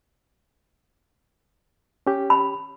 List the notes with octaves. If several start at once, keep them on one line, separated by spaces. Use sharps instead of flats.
C#4 G4
B5